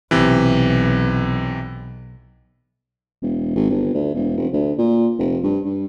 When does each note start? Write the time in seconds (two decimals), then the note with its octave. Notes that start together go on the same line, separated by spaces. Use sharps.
0.11 B1 C3 E3
3.22 E1
3.55 G#1
3.70 G1
3.94 D2
4.14 E1
4.37 F1
4.53 D2
4.78 A#2
5.19 F1
5.43 G2
5.64 G2